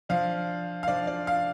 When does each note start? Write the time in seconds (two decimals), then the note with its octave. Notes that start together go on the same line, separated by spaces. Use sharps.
0.09 F3 D4 F5
0.83 F5
0.88 F3 D4 D5
1.07 D5
1.27 F5